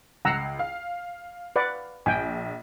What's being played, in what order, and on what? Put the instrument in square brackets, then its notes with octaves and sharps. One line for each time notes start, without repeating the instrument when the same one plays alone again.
[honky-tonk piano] C#2 C7 [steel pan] F#5 A#5 E6
[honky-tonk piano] F5
[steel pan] B4 D5 F#5
[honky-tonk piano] A#1 [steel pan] G5 G#5